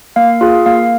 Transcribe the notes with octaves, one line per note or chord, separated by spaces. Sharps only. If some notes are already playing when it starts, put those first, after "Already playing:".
A#3 F5
F4 G#4
A#3 F5